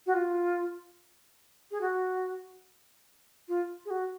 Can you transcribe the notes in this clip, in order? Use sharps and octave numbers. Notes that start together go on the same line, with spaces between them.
F#4
F4
G#4
F#4
F4
G#4
F#4